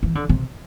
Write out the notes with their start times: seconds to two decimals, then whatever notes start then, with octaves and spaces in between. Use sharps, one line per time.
0.03 E3
0.15 D3
0.29 C3